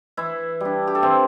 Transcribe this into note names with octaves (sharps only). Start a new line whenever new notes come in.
E3 E4 E5
G3 D4
G4
A4
E3 C4 C5